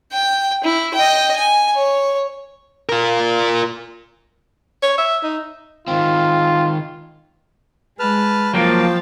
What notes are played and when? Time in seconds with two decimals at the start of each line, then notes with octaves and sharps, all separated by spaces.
0.12 G5
0.64 E4
0.95 D#5 G5
1.36 G#5
1.75 C#5
2.89 F4 A#4
4.83 C#5
4.98 E5
5.24 D#4
5.88 D#3 C4 F4
7.99 G#3 B4 A5 F6
8.54 F3 F#3 A#3 F5 G5 A5